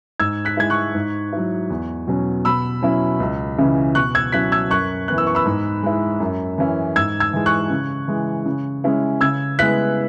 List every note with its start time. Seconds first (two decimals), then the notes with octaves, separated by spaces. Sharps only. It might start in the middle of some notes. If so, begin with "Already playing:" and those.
0.20 G#2 E6 G#6
0.45 F#6 B6
0.57 G#3 E4 G#6
0.70 C#6 F#6
0.95 G#2
1.33 F#3 E4
1.70 E2
2.07 B2 F#3 C#4
2.45 B2 B5 E6
2.82 F#3 C#4 E4
3.20 C#2
3.58 C#3 E3 C#4 E4
3.95 B2 C#6 F#6
4.15 E6 G#6
4.32 F#3 C#4 E4 F#6 B6
4.52 E6 G#6
4.70 F#2 C#6 F#6
5.08 E3 B3 F#6
5.18 E6
5.27 C#6
5.35 B5 E6
5.46 G#2
5.83 G#3 E4
6.20 F#2
6.58 E3 C#4 E4
6.96 G#2 E6 G#6
7.20 E6 G#6
7.33 E3 G#3
7.46 C#6 F#6
7.70 C#3
8.08 E3 G#3
8.46 C#3
8.84 G#3 C#4 E4
9.21 C#3 E6 G#6
9.59 G#3 B3 E4 F#6 B6